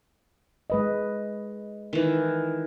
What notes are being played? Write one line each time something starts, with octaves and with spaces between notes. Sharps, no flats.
G#3 B4 D#5
D#3 E3